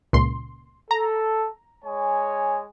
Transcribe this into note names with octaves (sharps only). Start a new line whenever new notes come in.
C#2 A#2 C6
A4 A#5
G#3 C#5 G#5